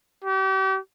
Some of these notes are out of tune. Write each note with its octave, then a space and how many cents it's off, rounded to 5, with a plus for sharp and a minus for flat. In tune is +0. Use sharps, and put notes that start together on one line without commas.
G4 -40